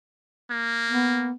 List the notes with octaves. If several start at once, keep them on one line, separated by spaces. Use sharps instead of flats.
A#3
B3